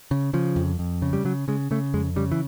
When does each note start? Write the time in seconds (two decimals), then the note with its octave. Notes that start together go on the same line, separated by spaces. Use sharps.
0.11 C#3
0.33 C#3 F3
0.56 F2
0.79 F2
1.02 C#3
1.13 G3
1.25 C#3 F#3
1.48 C#3 G#3
1.71 C#3 A3
1.94 F2 G#3
2.16 C#3 G3
2.32 E3